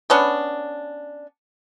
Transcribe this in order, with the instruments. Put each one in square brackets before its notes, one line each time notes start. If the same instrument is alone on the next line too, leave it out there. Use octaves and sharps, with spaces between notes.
[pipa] B3 C#4 D4